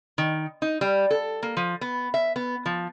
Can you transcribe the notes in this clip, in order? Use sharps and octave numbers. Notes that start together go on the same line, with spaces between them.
D#3
D#4
G3
A4
A#3
F3
B3
E5
B3
F3